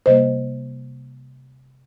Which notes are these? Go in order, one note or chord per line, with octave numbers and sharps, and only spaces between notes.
C3 G3 A#3 C5 D#5